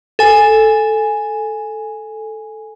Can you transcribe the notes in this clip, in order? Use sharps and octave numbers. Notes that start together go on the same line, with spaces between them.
A4 G#5